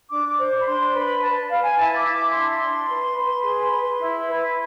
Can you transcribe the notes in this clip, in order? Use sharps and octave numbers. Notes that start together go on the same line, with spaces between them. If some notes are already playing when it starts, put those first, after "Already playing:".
D4 D6
D6
C5
B5
D4 C6
B4 B5
B4 A5
B4 F5
G#5
E4 A5
D6
E4
D6
D4 C6
D4
B4
B4
G#4
B4
E4
B4